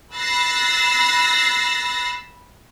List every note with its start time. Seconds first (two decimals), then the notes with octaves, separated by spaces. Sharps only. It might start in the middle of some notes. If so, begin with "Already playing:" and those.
0.14 B5 E6 F#6 A6 A#6 C7